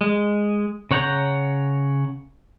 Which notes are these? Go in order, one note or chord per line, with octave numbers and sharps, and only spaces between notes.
G#3
C#3 C#5 F#5 A#5 G6